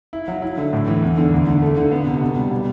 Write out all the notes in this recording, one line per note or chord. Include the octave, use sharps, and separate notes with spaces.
E4
F#3
E4
D3
A2
E3
E2
D3
D2
D3
A3
D3
B3
C3
B2
G3
B3